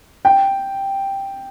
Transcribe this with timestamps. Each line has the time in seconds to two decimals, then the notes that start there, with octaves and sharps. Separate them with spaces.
0.25 G5